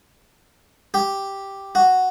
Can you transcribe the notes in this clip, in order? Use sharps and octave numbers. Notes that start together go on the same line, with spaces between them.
G4
F#4